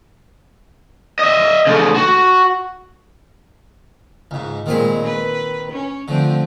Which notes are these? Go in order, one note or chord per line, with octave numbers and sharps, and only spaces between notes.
D#5 E5
C#3 A3
F#4
C#2 G#2
A#2 D#3 G#3 C4 B5
B4
C#4
D3 F3 A3 C4